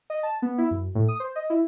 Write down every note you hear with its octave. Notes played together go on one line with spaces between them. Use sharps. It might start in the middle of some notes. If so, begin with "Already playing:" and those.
D#5
A5
B3
E4
F#2
A2
D#6
C5
D#5
E4